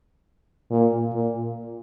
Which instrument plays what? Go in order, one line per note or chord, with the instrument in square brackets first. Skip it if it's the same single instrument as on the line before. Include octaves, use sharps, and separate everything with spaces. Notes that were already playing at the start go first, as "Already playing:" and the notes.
[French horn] A#2
A#2